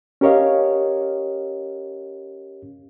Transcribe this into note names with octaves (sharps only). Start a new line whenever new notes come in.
C#4 G4 A#4 C#5 D#5 F5